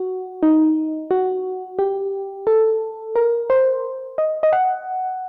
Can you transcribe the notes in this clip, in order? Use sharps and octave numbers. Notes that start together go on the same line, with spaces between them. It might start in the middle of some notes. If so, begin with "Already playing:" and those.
Already playing: F#4
D#4
F#4
G4
A4
A#4
C5
D#5
D#5
F#5